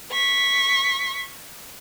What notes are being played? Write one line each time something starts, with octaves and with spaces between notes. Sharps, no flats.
C#6 B6